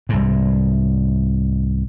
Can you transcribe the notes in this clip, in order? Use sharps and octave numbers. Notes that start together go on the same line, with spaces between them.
C2 G#2